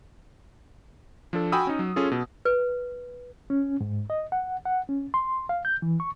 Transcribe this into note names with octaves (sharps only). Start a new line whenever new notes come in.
F3 D4 A4
F#4 G5 G#5 B5 D#6 E6
C#4 D#4
F#3
C#4 F4 G#4 A4
B2
B4
C#4
G#2
D#5
F#5
F#5
C#4
C6
F5
G6
E3
C#6